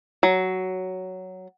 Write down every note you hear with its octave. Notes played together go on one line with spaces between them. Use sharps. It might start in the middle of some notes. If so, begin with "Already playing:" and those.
F#3